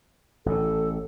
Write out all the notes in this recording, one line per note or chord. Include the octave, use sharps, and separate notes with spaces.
A1 A2 A4